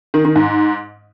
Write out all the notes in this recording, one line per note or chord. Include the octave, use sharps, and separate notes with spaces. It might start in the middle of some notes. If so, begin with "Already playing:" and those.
D#3
D#3
G#2